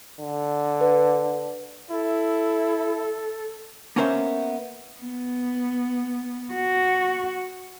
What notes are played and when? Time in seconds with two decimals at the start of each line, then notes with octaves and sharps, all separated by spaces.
0.20 D3
0.81 B4
1.91 E4 A4
3.96 A#3 B3 C#4 A#4 C5 E5
4.99 B3
6.53 F#4